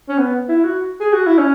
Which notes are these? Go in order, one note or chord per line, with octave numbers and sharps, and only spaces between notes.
C#4
B3
E4
F#4
G#4
F#4
E4
C#4